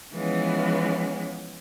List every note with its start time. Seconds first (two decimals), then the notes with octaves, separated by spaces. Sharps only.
0.14 E3 F3 G#3 B3 C#4